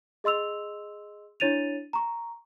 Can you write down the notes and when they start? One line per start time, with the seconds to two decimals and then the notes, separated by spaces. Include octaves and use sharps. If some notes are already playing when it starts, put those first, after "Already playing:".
0.24 G#4 D#5 C6 E6 F7
1.40 D4 E4 C#5 A6 D#7 F7
1.93 A#5 C#6